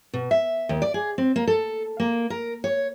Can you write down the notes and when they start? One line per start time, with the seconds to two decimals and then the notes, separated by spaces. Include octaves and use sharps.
0.13 B2
0.31 E5
0.69 D#2
0.82 D5
0.94 G#4
1.18 C4
1.36 A#3
1.47 A4
2.00 A#3
2.30 A#4
2.64 C#5